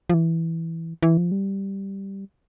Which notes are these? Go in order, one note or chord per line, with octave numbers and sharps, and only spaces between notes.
F3
E3
E3
F3
G3